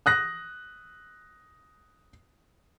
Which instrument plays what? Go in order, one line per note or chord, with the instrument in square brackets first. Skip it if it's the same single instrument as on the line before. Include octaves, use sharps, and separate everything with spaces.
[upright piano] D#6 F#6 A#6